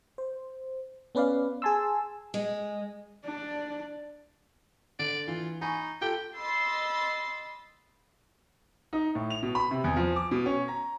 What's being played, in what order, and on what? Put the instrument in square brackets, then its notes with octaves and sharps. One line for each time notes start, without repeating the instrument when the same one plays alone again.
[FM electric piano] C5
B3 C#4 B4 D5 F5
G#4 G#5 A5 C6 E6
[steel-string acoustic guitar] G#3
[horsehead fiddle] D4 D5
[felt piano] D3 [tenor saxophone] D5
[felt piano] E3 [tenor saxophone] F4
[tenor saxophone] D#4 [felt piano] G#5 B5 C#6
[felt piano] F4 A4 [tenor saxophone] G4
[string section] D#5 B5 C6 E6 A6 C7
[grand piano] D#4
A2
F7
B2
B5
C3
E2
F3
D6
B2
C#4
A#5